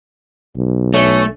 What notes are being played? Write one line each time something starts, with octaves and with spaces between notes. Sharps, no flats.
B1
A3 C#4